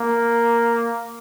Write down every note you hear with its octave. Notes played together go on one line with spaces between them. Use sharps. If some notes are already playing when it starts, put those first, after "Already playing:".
Already playing: A#3